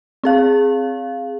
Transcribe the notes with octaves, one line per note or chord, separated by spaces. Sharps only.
C4 G#4 F5